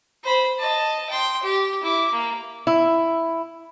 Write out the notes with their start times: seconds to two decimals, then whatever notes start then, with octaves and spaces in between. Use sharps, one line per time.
0.23 C5 B5
0.59 D#5 A5
1.09 G5 C6
1.43 G4
1.83 E4 D6
2.12 A#3
2.67 E4